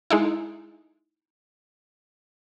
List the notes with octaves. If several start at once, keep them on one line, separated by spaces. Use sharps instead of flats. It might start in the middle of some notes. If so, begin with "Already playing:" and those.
G#3 D#4 E4